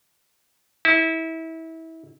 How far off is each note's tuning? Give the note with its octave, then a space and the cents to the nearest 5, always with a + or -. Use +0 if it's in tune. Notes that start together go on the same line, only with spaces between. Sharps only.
E4 -25